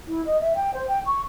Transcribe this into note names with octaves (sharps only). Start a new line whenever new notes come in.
E4
D#5
E5
G5
C5
G5
C#6